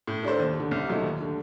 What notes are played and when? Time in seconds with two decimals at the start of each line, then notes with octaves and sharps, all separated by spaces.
0.07 A2
0.23 A3 D4 A4 C5
0.39 D#2
0.55 D3 A3
0.71 C2
0.88 A#2 F#3 A3 D#4
1.03 D#2
1.20 D3 A3